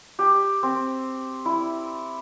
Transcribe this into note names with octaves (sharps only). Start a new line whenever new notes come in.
G4
C4
E4